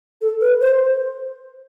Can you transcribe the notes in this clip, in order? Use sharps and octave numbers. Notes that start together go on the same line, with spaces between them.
A4
B4
C5